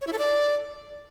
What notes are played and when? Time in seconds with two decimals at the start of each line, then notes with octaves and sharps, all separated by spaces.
0.01 C#5
0.07 E4
0.13 A4
0.18 D5